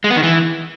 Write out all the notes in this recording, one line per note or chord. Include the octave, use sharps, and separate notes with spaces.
G#3
B3
D#3
E3